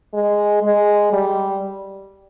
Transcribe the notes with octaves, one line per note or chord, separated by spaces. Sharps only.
G#3
G#3
G3